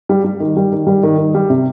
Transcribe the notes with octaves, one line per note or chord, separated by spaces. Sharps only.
G3
G3
D#3
G3
D#3
G3
D#3
D#3
G3
C3